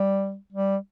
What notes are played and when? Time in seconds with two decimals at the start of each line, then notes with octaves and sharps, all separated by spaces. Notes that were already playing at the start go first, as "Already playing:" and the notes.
Already playing: G3
0.52 G3